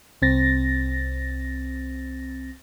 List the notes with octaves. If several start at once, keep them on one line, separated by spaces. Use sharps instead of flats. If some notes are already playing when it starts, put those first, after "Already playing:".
C2 C4 A6 A#6